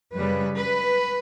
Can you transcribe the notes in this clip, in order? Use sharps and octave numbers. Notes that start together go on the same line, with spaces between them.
F#2 C#3 G3 B4
B4